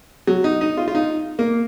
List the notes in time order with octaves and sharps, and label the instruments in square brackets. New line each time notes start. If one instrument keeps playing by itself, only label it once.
[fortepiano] F#3
D#4
D#4
F4
F4
D#4
A#3